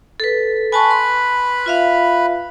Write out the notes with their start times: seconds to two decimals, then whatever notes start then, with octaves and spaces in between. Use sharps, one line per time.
0.20 A4 B4
0.72 B4 G#5 A5 B5 C#6
0.91 C6
1.66 F4 E5 F5